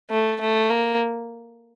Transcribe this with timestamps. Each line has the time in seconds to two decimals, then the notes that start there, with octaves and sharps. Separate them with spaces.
0.10 A3
0.40 A3
0.70 A#3